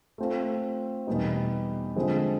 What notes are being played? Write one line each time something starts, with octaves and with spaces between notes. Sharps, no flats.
A3 C4 F4 A4
E2 B2 G3 B3 D#4
D3 F3 G#3 C4